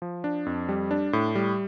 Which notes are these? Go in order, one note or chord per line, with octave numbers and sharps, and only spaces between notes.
F3
D4
F2
G3
D4
A2
G3